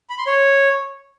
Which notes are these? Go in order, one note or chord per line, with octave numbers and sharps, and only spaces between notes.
B5
C6
C#5